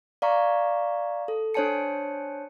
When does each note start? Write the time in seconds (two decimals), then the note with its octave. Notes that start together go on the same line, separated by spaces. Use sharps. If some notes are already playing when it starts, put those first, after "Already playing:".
0.22 D5 F5 A#5 C#6
1.28 A4
1.54 D4 C5 C#5 G#5 A5 C#7